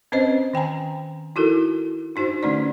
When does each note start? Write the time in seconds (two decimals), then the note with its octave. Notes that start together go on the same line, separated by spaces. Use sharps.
0.12 C4 C#4 B4 C5 D#5
0.54 D#3 G5 G#5 A#5
1.36 D#4 E4 F#4 A4 A#4
2.16 D4 D#4 F#4 C5
2.43 D3 A3 C#4 D#4 D5